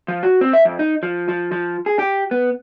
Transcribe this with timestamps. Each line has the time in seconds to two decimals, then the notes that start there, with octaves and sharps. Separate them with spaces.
0.08 F3
0.23 F#4
0.41 C4
0.53 E5
0.65 F2
0.79 D#4
1.03 F3
1.29 F3
1.52 F3
1.86 G#4
1.99 G4
2.31 B3